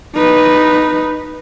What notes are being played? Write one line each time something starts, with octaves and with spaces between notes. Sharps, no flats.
D#4 B4